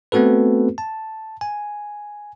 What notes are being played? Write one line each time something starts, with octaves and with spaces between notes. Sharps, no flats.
A3 B3 C4 F#4 A4 B4
A5
G#5